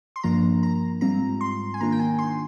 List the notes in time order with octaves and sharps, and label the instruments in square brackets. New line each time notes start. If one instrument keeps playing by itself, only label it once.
[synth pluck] C6
G2 F3 A#3 D4 F4 A#5
A#5
G#2 G3 C4 F4 A#5
C6
G#5
D#3 A#3 D4 F4 A#5
G5
G#5
C6